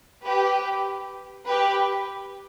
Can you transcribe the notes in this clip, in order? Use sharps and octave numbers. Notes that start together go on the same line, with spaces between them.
G4 B4
G4 B4